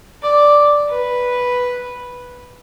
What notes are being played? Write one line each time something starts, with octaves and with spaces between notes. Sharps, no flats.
D5
B4